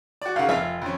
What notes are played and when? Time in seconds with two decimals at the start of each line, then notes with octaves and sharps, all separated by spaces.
0.22 F#4 D5
0.36 D#2 C#3 F5 F#5
0.49 F1 F4 E5 F5
0.82 F2 C#4